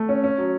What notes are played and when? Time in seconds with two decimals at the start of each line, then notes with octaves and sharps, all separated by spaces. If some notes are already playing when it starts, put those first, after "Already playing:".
Already playing: A3
0.09 C#4
0.24 C#4
0.38 F#3